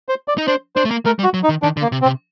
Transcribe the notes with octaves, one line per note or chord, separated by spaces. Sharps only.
C5
D5
D#4
D4 C5
D4 C5
A3
A#3
A3 A#4
G3
F#4
F#3
D#4
D#3
D#3 D4
D3
A#3
C3
C4
C3